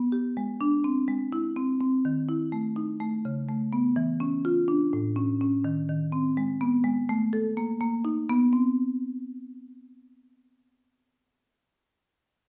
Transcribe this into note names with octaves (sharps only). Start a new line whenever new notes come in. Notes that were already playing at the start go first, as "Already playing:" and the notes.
Already playing: B3
G4
G#3
D4
C4
G#3
E4
C4
C4
D#3
E4
A3
D#4
A3
C#3
A3
B3
E3
C#4
F4
D4
A2
C#4
C#4
D#3
D#3
C4
G#3
B3
G#3
A3
A4
A#3
A#3
D#4
B3
C4